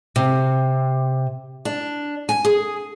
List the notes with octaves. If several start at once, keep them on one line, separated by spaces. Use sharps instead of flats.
C3
D4
G#5
G#4